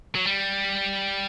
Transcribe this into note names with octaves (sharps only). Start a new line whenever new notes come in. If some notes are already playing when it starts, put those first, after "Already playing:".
F#3
G3